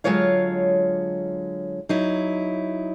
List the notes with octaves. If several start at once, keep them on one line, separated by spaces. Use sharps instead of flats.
D3 F#3 G#3 F4 C#5 F5
F#3 D#4 E4